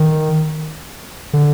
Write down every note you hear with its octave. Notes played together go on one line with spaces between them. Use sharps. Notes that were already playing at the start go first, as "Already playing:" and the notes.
Already playing: D#3
D3